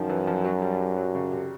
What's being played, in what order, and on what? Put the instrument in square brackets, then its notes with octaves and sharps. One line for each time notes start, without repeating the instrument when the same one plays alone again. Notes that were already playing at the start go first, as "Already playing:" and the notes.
Already playing: [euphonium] F#2 [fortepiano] D#3 F3
[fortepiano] E3
F3
F#3
G3
G3
F#3
C#3
C3